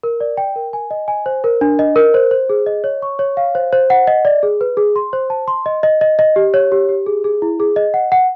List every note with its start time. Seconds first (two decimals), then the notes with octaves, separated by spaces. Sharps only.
0.03 A#4
0.20 D5
0.37 G5
0.56 A#4
0.73 G#5
0.91 D#5
1.08 G#5
1.26 C5
1.44 A#4
1.61 D4
1.79 D#5
1.96 A#4
2.14 C5
2.31 C5
2.50 G#4
2.66 D#5
2.84 C#5
3.02 C#6
3.19 C#5
3.37 F5
3.55 C5
3.73 C5
3.90 F#5
4.07 D#5
4.25 D5
4.43 G#4
4.61 B4
4.77 G#4
4.96 C6
5.13 C5
5.30 A5
5.48 C6
5.66 D#5
5.83 D#5
6.01 D#5
6.19 D#5
6.36 G4
6.54 C#5
6.72 G4
6.89 G4
7.06 G#4
7.24 G#4
7.42 E4
7.60 G#4
7.76 D#5
7.94 F#5
8.12 F#5